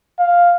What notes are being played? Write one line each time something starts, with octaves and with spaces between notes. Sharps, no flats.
F5